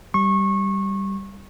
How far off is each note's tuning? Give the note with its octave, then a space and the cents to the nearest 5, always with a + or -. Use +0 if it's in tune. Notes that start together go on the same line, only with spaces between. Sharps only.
G3 +0 C#6 -25